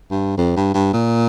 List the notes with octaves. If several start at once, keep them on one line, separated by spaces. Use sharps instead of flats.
G2
F2
G2
G2
A#2